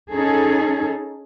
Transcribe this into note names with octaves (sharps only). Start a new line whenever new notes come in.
C#4 D#4 G#4 A4